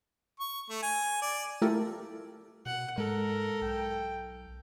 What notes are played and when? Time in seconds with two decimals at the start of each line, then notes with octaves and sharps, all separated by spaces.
0.40 C#6
0.70 A3
0.82 G#5
1.22 D5
1.62 A3 E4 F4 G4 A4 A#4
2.66 B2 F#5
2.98 G#2 G#3 A4 A#4
3.62 B1 G5